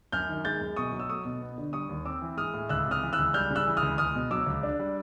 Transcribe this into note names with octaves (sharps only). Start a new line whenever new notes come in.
F#2 F6 G6
D#3
G#3 G6 A6
F#2
B2 C#6 D#6
F#3
E6
A3 C#6 D#6
B2
B3
D3
G3 C#6 D#6
D#2
C4 D6 E6
E3
G#3 D#6 F6
A2
C#2 E6 F#6
C3
D#6 F6
E3
E6 F#6
C#2
G3 F6 G6
C#3
E6 F#6
E3
D#6 F6
C#2
C#2 D#6 F6
B2
F#3 D6 E6
C#2
D4
G3